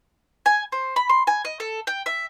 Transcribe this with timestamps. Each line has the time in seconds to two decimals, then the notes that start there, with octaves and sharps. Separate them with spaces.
0.46 G#5
0.72 C5
0.96 B5
1.09 C6
1.27 G#5
1.45 D#5
1.60 A4
1.87 G5
2.06 E5